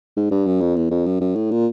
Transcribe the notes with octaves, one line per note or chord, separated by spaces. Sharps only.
G#2
G2
F#2
F2
E2
F2
F#2
F#2
A2
A#2